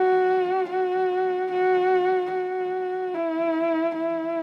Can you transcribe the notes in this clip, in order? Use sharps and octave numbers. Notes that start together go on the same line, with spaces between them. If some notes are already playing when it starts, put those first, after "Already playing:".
Already playing: F#4
F#4
F#4
F#4
E4
E4